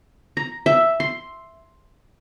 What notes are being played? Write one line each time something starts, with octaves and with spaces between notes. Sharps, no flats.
A#5
E5
C6